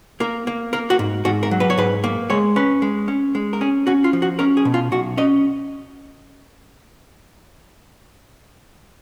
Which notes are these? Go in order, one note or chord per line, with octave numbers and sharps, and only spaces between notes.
A#3 A#4
A#3
A#3 A#4
F#4
G#2
G#2 F#4
A#4
F#3
B4
C#5
G#2 B4
A#3
G#3 C#5
C#4 B4
G#3
C#4
G#3
A#4
C#4 G#4
C#4 F#4
F4
F3
F#4
C#4 A#4
G#4
B2
F4
B1 F#4
C#4 D#5